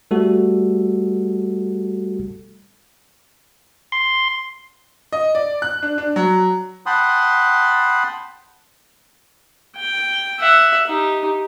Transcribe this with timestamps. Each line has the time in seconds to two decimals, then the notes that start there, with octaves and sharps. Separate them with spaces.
0.11 G3 A3 F#4 A4
3.92 C6
5.13 D#5
5.35 D5
5.62 F#6
5.83 D4
5.98 D4
6.16 F#3
6.86 F#5 G5 A5 B5 C6 D#6
9.76 G5
10.39 E5 F#5
10.87 D#4 G4